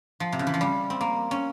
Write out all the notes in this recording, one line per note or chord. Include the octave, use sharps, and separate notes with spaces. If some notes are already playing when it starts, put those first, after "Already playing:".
F3
C3
C#3
E3
F3
G3
C4
A#3
C#4